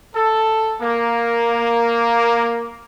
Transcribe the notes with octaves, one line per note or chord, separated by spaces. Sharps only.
A4
A#3